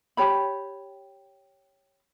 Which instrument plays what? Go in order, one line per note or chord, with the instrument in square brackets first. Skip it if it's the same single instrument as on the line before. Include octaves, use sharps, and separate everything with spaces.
[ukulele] G4 C#5 B5